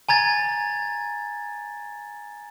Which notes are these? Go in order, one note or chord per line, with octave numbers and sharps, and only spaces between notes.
G#5 A#5 G#6 A6